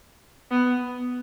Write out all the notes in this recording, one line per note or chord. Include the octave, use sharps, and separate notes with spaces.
B3